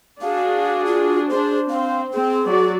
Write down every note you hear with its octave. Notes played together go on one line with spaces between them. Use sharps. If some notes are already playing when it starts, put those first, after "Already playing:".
D4 F#4 G#4 F5
F4
D4 G#4 C5
C4 C5 F5
C4 G#4
F#3 F#4 D5